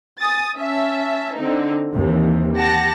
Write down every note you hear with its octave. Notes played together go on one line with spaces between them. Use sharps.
G#5 D#6 A6
C#4 E5 A5
D3 C4 D#4
D#2 C3 E3
G4 F#5 A5 A#6